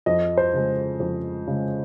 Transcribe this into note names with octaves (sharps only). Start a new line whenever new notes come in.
F2 D#5
C5
C#3 G#3
F2
C#3 G#3